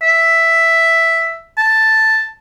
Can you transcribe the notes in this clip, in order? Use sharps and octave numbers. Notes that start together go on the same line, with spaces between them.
E5
A5